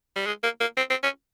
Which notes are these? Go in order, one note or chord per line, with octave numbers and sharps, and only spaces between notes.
G3
G#3
A#3
A#3
C4
C4
C#4